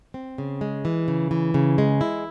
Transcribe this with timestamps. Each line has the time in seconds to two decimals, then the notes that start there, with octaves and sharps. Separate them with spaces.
0.14 C4
0.38 C#3
0.61 G#3
0.85 E3
1.08 C#3
1.31 E3
1.54 C#3
1.78 G#3
2.01 E4